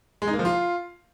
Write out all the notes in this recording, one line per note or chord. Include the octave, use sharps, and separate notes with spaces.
G#3
D#4
A#3
F3
F4